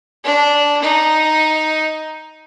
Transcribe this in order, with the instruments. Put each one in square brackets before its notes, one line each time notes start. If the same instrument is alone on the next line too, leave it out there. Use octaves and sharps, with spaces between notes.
[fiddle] D4
D#4